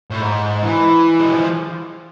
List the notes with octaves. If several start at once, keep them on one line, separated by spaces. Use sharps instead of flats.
A2
G#2
E3
G#3
F3